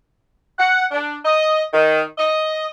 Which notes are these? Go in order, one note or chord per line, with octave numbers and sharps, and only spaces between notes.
F#5
D4
D#5
D#3
D#5